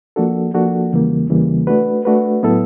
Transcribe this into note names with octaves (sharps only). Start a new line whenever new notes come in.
F3 A#3 D4 F#4 A4
F3 A#3 D4 F#4 A4
E2 C#3 E3 G3 A#3
E2 C#3 E3 G3 A#3
A3 D4 F#4 B4
A3 D4 F#4 B4
A2 F#3 B3 E4 A4